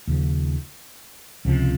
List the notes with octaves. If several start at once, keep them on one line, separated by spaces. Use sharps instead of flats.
D#2 C#3 F3
C#2 C3 F3